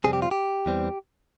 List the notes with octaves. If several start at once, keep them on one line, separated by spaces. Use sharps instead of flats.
F2 C3 G3 C4 G#4
G4
F4
G4
E2 E3 G3 C4